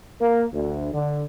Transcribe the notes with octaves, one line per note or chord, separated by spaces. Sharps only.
A#3
D2
D3